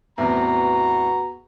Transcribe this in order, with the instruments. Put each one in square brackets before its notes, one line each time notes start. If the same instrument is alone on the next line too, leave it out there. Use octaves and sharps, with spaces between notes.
[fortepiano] E2 A2 C3 [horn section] B3 F#4 A#5